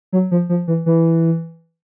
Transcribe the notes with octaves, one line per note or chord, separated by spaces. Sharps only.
F#3
F3
F3
E3
E3